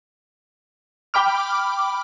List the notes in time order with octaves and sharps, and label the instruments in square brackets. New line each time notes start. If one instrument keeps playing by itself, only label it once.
[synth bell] G5 B5 D6 F6